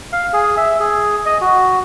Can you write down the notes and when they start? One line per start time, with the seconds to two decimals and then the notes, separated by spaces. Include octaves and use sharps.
0.13 F5
0.33 G#4
0.57 E5
0.80 G#4
1.26 D#5
1.41 F#4